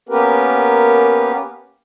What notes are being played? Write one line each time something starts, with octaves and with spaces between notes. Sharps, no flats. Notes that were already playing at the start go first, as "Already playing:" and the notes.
A#3 B3 C#4 G4 A#4 B4